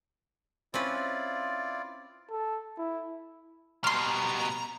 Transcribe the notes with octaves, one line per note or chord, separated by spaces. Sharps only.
C4 C#4 E4 F4 B4 D5
A4
E4
B2 G3 A#5 C6 F6